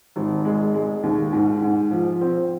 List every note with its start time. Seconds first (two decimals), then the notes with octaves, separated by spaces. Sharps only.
0.16 G#1
0.45 G#3
0.74 G#3
1.03 D#2
1.33 G#2
1.62 G#2
1.91 F3
2.21 C4